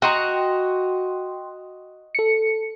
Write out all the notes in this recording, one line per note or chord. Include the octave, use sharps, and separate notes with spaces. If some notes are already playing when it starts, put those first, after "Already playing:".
F#4 D#5 G5 A#5 C6
A4 C#7